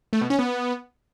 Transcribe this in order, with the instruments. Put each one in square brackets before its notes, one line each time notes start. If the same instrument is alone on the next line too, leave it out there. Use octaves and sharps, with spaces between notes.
[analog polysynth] A3
B2
C#4
B3